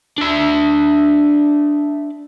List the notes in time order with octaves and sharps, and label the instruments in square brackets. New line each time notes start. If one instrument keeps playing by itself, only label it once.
[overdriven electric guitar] D4 E5